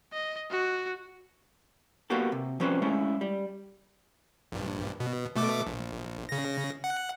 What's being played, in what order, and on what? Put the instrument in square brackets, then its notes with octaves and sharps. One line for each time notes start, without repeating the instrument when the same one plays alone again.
[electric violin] D#5
F#4
[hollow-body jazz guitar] A#3 B3 F#4 G4 A4
C3
F3 C4 C#4 G4 B4 C5
G#3 A3 C#4 E4
G3
[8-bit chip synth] A#1 G2
B2
B2 A3 D6
A#1
C#3 A#6
F#5